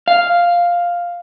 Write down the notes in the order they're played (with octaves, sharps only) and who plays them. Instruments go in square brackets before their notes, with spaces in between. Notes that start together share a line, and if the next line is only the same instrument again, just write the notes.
[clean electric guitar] F5